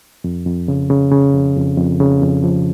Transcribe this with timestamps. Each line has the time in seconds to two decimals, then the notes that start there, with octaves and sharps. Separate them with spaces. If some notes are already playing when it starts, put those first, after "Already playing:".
0.24 F2
0.46 F2
0.68 C#3
0.90 C#3
1.12 C#3
1.34 F2
1.57 F2
1.77 F2
2.00 C#3
2.22 F2
2.44 F3